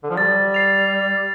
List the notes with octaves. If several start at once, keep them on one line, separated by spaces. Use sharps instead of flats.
D3
F3
G3 A6
C7 F7
A6